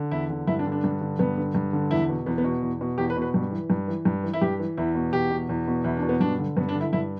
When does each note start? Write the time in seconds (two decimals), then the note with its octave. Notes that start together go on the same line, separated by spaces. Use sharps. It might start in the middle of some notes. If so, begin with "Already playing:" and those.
Already playing: D3
0.11 E2 E4
0.30 D3
0.47 G2 E4
0.59 D4
0.66 D3
0.72 D4
0.84 G2
1.01 D3
1.19 G2 B3
1.38 D3
1.55 G2
1.73 D3
1.91 E2 E4
2.09 B2
2.26 E2 B3
2.38 B3
2.44 B2
2.62 E2
2.81 B2
2.98 E2 G4
3.10 B4
3.17 B2
3.22 B4
3.34 G2
3.51 E3
3.70 G2
3.88 E3
4.05 G2
4.24 E3
4.33 E4
4.41 G2 G4
4.60 E3
4.77 E2 E4
4.95 B2
5.13 E2 G4
5.31 B2
5.49 E2
5.67 B2
5.84 E2 E4
5.97 D4
6.02 B2
6.09 B3
6.20 G2 D4
6.39 D3
6.57 G2 B3
6.69 D4
6.75 D3
6.81 E4
6.93 G2 E4